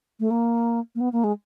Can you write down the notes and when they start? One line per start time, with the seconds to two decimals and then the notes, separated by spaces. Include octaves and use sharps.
0.20 A3
0.31 A#3
0.95 A#3
1.00 B3
1.13 A#3
1.24 G#3